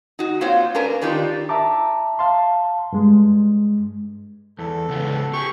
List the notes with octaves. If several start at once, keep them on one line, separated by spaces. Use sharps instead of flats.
D#4 F#4
A#3 C4 F4 C5 C#5 G5
C#4 D4 A#4 B4
D#3 D4 D#4 F4 G4 A#4
E5 A5 A#5 D6
F5 A5 C6
G2 G#3
E2 A4
C#2 B3
G4 G#4 C#6